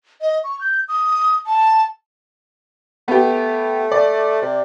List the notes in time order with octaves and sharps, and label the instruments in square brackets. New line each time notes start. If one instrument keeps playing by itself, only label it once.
[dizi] D#5
C#6
G6
D#6
A5
[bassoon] A3 [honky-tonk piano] B3 G4
[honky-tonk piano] D5
[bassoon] C3